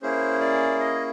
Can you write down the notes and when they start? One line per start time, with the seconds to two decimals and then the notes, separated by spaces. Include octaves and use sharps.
0.02 A#3 C#4 E4 G#4 C5
0.41 D5
0.80 D#5